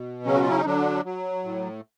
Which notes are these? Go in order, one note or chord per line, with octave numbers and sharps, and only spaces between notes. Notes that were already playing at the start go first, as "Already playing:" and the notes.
Already playing: B2
C#3 F#3 C#4
F#4
F4
E4
D#4
D3 F#3 D4
F#3
A2